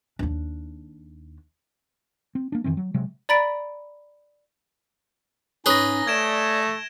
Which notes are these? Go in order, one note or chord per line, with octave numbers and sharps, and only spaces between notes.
D#2 D4
C4
A#3 D4
F2 D#3 E3 C4
F#3
C3 F#3 G#3
D5 A#5 B5 A6 B6 D7
G#2 C#4 D#4 G#4 B4 C#5 A#6 G7
A3 D5 G#6 D7 E7